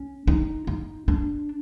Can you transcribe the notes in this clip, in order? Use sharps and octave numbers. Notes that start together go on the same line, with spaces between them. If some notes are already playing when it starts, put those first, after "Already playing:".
Already playing: C#4
D#4
D#4
D4